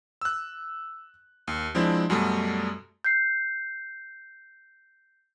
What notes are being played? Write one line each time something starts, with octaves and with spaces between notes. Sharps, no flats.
E6 F#6
D#2
F3 G#3 C4 D4 E4
F#2 B2 G3 A3
G6 C7